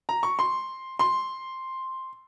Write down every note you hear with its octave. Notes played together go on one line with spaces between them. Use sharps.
A#5
C#6
C6
C6